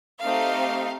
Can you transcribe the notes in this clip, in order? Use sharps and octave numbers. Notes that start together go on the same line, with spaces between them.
A3 C4 D#4 G4 F5